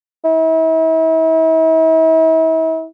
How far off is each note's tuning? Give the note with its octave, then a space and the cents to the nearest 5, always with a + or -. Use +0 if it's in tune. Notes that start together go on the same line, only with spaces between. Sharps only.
E4 -40